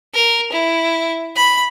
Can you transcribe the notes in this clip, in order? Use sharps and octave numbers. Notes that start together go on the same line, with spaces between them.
A#4
E4
B5